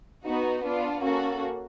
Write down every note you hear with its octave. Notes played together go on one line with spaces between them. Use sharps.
B3 D#4 F#4
B3 D4 F4
A#3 C#4 F#4 A4